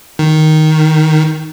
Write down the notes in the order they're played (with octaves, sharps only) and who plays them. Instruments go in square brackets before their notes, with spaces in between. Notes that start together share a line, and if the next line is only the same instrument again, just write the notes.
[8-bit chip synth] D#3